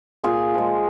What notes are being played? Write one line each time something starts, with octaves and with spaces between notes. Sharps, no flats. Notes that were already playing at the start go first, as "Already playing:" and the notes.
A#2 F4 G#4
F3 G#3